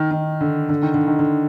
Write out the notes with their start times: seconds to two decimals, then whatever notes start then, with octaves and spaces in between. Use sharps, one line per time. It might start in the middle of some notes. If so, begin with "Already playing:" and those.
Already playing: D#3
0.11 D#3
0.41 D3
0.69 D3
0.83 D#3
0.94 D3
1.07 D#3
1.19 D3